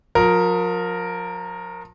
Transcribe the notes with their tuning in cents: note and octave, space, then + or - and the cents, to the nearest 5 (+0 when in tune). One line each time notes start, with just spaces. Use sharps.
F3 +40 A#4 +0